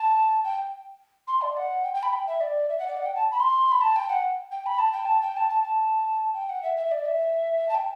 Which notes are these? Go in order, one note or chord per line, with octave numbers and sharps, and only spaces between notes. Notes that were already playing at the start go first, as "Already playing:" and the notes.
Already playing: A5
G5
C6
D5
F#5
G5
G5
B5
G5
E5
D5
E5
F#5
D5
F#5
G5
A5
B5
C6
B5
A5
G5
F#5
G5
B5
A5
G5
A5
G5
A5
A5
A5
G5
F#5
E5
E5
D5
E5
A5
G5